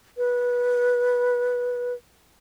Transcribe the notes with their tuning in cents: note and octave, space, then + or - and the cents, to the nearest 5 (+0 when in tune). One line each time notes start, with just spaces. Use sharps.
B4 -15